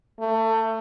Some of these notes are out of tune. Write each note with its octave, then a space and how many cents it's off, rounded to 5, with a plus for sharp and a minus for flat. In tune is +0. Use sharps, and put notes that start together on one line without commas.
A3 +25